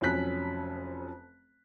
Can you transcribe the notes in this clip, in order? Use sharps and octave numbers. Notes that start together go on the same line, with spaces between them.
F1 F2 F#3 C#4 F#6 B6